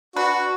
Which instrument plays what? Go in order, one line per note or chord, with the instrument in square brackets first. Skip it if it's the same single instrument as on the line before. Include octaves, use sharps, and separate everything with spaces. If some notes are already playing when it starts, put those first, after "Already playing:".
[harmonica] D4 F#4 [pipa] B4